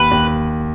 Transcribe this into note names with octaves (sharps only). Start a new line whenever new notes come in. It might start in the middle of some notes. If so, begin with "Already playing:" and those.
Already playing: D#2 B4
D#2